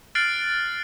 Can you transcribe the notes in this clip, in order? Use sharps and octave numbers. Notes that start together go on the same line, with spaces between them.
F6 F#6 A6 C7 D7 F#7